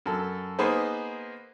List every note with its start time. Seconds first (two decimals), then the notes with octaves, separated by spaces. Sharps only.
0.06 F#2 A4
0.59 A#3 B3 D#4 G#4 B4 C5